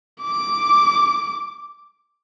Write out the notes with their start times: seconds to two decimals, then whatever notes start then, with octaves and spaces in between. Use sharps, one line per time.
0.22 D6